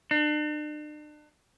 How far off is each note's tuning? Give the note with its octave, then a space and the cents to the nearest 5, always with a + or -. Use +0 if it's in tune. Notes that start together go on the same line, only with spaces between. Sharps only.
D4 +40